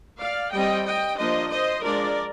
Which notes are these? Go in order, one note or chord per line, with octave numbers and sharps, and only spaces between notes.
D5 F5
G3 C4 D#5 G5
D#5 G5
F3 A#3 D4 C5 D#5
C5 D#5
F3 G#3 D4 A#4 D5